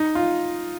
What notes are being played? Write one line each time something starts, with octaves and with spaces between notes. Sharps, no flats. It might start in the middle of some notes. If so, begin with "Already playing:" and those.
Already playing: D#4
F4